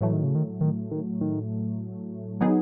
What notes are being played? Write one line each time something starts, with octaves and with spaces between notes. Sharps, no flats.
A2 E3 F#3 A3
D#3
C#3
D#3
D#3
D#3
D#3
D#3 F#3 B3 D#4 G#4